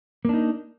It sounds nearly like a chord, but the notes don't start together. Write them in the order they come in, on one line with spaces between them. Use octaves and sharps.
A#3 D4 D#4